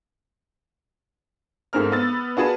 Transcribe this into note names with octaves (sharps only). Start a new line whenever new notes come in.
G#2 A3 C4 A#4 F6
B3 E6 A6
D4 F#4 G#4 B4 A5